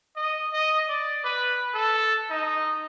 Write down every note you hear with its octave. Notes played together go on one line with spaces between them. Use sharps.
D#5
D#5
D5
B4
A4
D#4